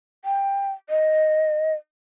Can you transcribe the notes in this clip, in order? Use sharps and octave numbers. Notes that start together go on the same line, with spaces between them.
G5
D#5